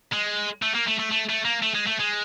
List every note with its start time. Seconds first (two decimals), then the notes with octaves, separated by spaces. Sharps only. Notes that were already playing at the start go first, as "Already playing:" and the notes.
0.12 G#3
0.63 A3
0.75 A#3
0.88 A3
0.99 A3
1.12 A3
1.30 A3
1.45 A#3
1.62 A3
1.75 G#3
1.87 A3
2.00 G#3